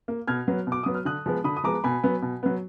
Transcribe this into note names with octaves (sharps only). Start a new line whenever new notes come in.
A#3
B2 F6 G#6
F#3 B3
B2
D6
F#3 B3 D#6
F6
D3 D#6 F#6
F3 G#3 B3
D3 B5 D#6
D#6
F3 G#3 B3 A#5 D6
B2 G#5 B5
F#3 B3
B2
F#3 B3